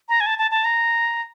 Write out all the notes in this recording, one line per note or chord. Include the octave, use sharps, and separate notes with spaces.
A#5
G#5
A5
A5
A5
A#5